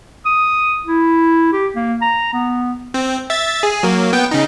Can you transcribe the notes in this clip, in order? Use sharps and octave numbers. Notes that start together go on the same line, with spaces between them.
D#6
E4
G4
A#3
A#5
B3
C4
E5 A6
G#4
F#3 A#3
B3 G5
C#3 D#4